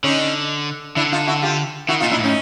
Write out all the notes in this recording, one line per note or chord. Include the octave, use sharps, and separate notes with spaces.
D3 C#4 D#4
D3 D4 E4
D#4 F4
E4 F#4
F4 G4
D#3 E4 F#4
D#4 F4
A#2
D4 E4
A2 C#4 D#4